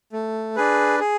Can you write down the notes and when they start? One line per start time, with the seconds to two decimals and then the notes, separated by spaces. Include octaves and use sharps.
0.13 A3
0.56 D4 G#4 B4
1.00 G#4